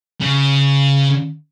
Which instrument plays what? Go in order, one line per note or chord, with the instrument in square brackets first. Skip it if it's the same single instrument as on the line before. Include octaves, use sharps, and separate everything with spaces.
[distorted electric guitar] C#3